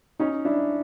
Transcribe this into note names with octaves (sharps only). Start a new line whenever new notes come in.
C#4 D#4
D4 E4